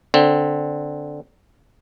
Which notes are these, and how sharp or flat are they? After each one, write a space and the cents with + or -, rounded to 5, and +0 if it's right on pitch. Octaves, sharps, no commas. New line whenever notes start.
D3 +0 C4 +0